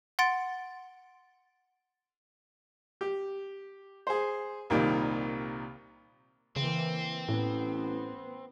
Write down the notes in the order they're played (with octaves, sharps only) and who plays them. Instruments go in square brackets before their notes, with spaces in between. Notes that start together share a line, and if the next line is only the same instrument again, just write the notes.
[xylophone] F#5 C6 A6 D7
[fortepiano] G4
G#4 C5
C2 A#2 D#3 G3
[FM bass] C#3 [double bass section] E3 A#3 [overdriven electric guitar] C4
[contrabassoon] A1 [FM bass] A2 [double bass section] B3